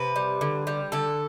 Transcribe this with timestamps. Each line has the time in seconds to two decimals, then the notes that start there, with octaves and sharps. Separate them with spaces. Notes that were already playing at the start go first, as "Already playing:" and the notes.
Already playing: C3 B4
0.16 G3
0.41 D3
0.67 G3
0.92 D3 A4